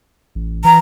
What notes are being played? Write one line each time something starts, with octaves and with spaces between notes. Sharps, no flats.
A1
E3 A#5